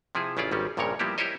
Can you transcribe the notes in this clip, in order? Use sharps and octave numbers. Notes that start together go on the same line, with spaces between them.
C3 F3 E4 G#4
A1 C#3 E4 F4 D5
G#1 D#3 G3 C#4
A#1 G2 A#2 C#3 A#4 C#5
F3 G3 A#3 B3 E4 G4
E4 G4 A#4 C5 C#5 D#5